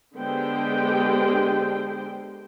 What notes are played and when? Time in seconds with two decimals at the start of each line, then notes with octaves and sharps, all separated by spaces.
0.16 D3 G#3 B3 G4 C5 G5